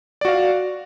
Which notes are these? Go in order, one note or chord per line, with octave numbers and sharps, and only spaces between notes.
F#4 D5 F5